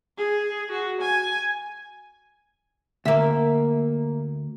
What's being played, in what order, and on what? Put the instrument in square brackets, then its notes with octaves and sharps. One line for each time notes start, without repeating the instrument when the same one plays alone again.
[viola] G#4
F#4
G#5
[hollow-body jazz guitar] D2 [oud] A#3 E5